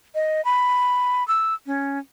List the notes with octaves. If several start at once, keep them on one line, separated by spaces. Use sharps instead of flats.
D#5
B5
E6
C#4